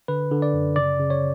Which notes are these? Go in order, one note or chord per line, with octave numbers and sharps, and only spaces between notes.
D3 B4
D3
D5
F#2
C#3 D5
C#3
C#5